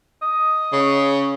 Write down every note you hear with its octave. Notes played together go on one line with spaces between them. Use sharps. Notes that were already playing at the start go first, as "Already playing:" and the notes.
D#5
C#3